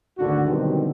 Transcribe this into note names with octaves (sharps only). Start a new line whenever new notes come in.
G#1 D2 D3 F#4
B2 D3 D#3 F#3 G3 C4